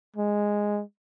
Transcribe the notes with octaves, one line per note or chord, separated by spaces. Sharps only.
G#3